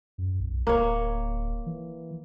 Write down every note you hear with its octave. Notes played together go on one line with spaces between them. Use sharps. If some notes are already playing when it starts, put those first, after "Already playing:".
F#2
B1
D1 A#3 C#5
E3